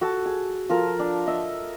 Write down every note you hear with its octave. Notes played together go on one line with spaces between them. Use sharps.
F#4 A4 A5
G#4
F3 A4 A#4
D4
D#5 E5